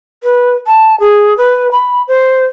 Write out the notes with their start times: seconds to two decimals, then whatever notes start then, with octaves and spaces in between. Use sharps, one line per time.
0.23 B4
0.67 A5
1.00 G#4
1.37 B4
1.71 B5
2.08 C5